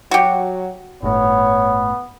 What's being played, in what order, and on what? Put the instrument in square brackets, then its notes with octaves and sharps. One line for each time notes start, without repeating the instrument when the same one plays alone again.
[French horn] F#3 [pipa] F#4 G4
[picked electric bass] G1 A2 [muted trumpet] B3 [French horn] C#5